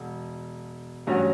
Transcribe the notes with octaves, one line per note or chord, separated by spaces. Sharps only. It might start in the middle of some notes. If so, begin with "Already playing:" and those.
Already playing: E1
A1 G2 F#3 C#4 F#4